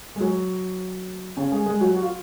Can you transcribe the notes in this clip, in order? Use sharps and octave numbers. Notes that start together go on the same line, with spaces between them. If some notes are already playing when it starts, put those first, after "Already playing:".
G#3
F#3
C#3 C#4
G#3 G#4
G#3 G#4
F#3 F#4
F#4
F4